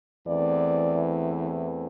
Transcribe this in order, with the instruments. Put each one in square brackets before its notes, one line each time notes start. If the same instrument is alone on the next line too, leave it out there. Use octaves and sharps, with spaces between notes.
[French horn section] E2 E3 A3 C4 D5